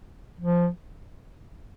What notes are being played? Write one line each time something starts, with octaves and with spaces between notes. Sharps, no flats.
F3